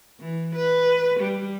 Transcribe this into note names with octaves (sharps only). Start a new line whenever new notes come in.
E3
B4
G3